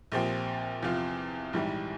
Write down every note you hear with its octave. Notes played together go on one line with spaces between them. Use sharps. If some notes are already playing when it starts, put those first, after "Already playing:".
A#1 A#2 F3 C4 G4
E2 C3 F3 C4 F4
A#1 G#2 E3 G3